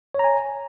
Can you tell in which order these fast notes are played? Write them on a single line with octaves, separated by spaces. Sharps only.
C#5 A#5 G#5